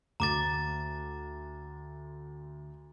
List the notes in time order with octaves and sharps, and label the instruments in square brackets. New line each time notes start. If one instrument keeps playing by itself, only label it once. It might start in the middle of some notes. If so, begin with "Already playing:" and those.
[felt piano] D2 [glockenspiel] A#5 D6 A6